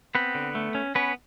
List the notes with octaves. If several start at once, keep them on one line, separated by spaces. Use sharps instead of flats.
B3 C4 B4
D3
A3
C#4
B3 C#4 B4